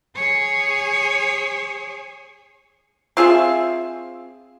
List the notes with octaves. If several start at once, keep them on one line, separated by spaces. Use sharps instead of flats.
G#4 C#5
C4 F4 G#4 E5